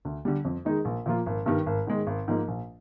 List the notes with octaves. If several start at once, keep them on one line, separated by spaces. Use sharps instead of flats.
D2
D3 G3
F2
D#3 G#3 D#4 G#4
A#1
A#2 F3 A#3 F4
G#1
G2 D#3 G3
G#1
G#2 D#3 G#3
G#1
G#2 F3 A#3 D#4
A#1